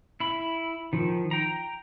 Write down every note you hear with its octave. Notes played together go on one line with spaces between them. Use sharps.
E4 B5
D#3 F3
G5 A#5